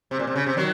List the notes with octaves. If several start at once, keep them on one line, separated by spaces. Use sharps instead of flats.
C3
A#2
C3
C#3
C3
D#3 F#3